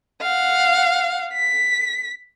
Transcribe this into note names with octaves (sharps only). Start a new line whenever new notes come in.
F5 F#5
B6